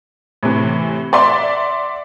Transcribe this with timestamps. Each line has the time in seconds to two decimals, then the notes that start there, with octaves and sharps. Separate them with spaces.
0.43 A2 C3 E3
1.13 D5 E5 F#5 C6 D6